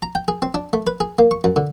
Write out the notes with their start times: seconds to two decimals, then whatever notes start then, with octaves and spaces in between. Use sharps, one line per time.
0.02 A#5
0.15 G5
0.28 G#4
0.42 C4
0.54 D4
0.73 A3
0.87 B4
1.00 G#4
1.19 A#3
1.31 C#6
1.44 F#2
1.56 D3